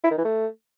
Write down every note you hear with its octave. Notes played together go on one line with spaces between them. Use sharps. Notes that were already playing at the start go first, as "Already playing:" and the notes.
E4
D#3
E3
A3